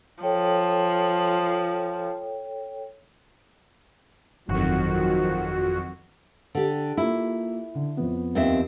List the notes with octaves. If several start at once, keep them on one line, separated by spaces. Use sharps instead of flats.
F3 A4 C#5 G5
G1 F2 D#3 F3 F#3 F#4
D3 G4
A#3 E4 F4 E6
D3
F2 F3 B3
D#2 C4 E5